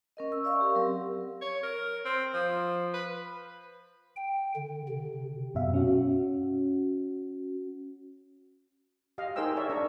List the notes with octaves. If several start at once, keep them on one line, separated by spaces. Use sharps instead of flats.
C#4 A#4 D#5
C#6 E6
D5 E5 F5 C#6
G4 A#4 F5
F#3 C4 A#4
C#5
A#4
C4
F3
B4
G5
D3
C3
F#2 B2 E5 F5
C#4 F#4
G4 D#5 F5
D#4 G#4 A#4 C5 G5 E6
A#4 C#5 D5 E5
D4 A#5 C#6